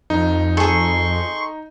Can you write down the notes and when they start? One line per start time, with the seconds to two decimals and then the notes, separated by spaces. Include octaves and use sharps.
0.10 F2 D#4
0.57 G#4 A4 C6 C#6